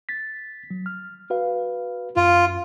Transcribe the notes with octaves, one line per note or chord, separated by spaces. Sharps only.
A6 B6
F#3
F6
F#4 B4 F5
F#2 F4